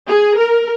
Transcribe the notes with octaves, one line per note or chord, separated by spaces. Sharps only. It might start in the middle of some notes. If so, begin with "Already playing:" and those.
G#4
A#4